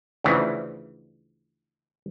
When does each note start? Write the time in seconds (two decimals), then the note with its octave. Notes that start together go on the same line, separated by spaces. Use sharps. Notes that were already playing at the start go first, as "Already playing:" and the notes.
0.24 D2 C#3 E3 F3